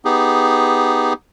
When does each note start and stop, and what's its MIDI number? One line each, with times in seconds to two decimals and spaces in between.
0.05 1.13 59
0.05 1.13 63
0.05 1.13 67
0.05 1.13 68